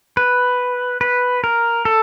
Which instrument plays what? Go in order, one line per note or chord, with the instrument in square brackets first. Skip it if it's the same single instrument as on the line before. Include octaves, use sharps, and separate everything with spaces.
[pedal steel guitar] B4
B4
A#4
A4